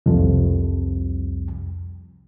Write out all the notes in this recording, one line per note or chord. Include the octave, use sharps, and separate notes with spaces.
C2 F2